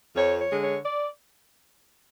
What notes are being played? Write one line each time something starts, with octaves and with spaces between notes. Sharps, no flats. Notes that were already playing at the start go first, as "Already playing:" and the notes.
F2 C#5
C#5
D3 G#3
C#5
D5